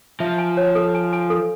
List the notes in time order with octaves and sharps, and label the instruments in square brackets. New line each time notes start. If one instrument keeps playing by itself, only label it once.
[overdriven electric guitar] F3 [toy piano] E5
[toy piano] G#5
C#5
A4
G#5
G#5
A4